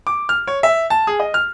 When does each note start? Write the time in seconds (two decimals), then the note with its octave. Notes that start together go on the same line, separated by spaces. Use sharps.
0.07 D6
0.29 F6
0.47 C#5
0.63 E5
0.90 A5
1.07 G#4
1.20 D#5
1.34 F6